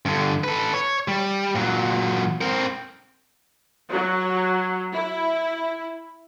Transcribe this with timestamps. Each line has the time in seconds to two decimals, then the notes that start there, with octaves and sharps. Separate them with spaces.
0.05 G2 D3
0.44 A4 B4
0.74 C#5
1.08 G3
1.55 A#2 F#3
2.41 C4 A#4
3.90 F#3
4.92 E4